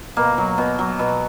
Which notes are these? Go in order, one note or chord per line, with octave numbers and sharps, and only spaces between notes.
B2 A#3
F#3
B2
F#3
B2